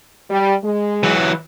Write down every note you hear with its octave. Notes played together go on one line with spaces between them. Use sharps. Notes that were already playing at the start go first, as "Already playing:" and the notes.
G3
G#3
E3 F#3